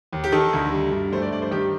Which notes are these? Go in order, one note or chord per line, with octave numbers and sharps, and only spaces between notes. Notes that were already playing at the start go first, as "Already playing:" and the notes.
D#2
G4
D#3 A4
D2
G3
G2
A3 C5
D5
G2 D5
C5
D#3 G4